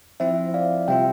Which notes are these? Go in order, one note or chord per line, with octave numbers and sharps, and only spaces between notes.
F3 C4 E4 C5 E5
D5 F5
C3 G3 C4 F4 E5 G5